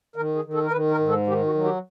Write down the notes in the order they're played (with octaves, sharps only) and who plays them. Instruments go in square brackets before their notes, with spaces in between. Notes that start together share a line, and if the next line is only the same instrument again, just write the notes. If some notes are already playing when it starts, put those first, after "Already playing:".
[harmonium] D#3 A#4
G#4
D#3
A4
A#4
D#3 B4
A#4
G#2
A4
D#3 G4
F#4
F#3
G4